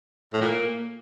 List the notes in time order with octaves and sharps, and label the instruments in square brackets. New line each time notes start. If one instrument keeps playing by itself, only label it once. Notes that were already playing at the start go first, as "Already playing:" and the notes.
[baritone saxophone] A2
[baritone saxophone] A#2 [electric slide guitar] A#3